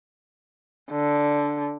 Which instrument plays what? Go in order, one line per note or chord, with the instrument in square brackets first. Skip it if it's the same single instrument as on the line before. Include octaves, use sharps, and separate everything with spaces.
[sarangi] D3